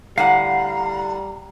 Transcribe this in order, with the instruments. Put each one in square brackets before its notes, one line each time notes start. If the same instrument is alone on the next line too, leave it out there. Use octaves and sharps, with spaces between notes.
[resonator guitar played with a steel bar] A2 D3 F#5 [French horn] G3 [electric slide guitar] F5 [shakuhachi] A#5